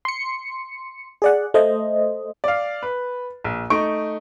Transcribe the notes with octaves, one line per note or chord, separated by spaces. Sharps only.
C6 C#7
G#4 D5 F#5
A3 C5 D#5
D5 F5
B4
A#1
A3 D#4 C#6 D7